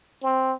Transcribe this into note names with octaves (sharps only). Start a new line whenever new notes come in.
C4